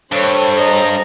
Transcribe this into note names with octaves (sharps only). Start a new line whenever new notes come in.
G2 A4 C5 C#5
D#5 A#5